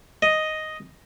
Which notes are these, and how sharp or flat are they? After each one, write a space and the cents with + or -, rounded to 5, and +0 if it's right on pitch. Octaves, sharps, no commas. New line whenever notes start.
D#5 +0